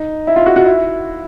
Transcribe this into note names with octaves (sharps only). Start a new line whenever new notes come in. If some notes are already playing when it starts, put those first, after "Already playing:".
Already playing: D#4
E4
F4
F#4
F#4
E4